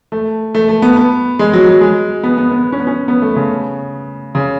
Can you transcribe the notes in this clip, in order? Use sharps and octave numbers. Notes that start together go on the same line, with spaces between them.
A3
A3
A3
B3
B3
G#3
F#3
F#3
G#3
B3
B3
B3
C#4
B3
C#4
B3
A3
C#3
C#3